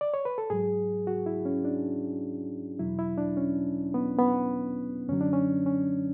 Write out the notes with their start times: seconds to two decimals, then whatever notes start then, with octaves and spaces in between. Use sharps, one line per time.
0.01 D5
0.14 C#5
0.25 B4
0.38 A4
0.50 G#2 F#3 G#4
1.07 F#4
1.26 E4
1.45 C#4
1.65 D4
2.79 E2 B2 F#3 E4
2.99 E4
3.18 D4
3.37 C#4
3.94 B3
4.18 B3
5.08 F#2 D3 F#3 C#4
5.21 D4
5.33 C#4
5.66 C#4